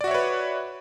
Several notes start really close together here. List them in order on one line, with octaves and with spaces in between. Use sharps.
D5 F#4 E5 C#5 B4